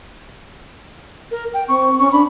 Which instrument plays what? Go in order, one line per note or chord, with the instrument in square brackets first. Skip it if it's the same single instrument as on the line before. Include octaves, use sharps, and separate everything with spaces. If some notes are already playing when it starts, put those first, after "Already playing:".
[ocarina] A#4
G5
[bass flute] C4 [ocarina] C#6
[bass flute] C#4 [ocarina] C#6
[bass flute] D4 [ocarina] B5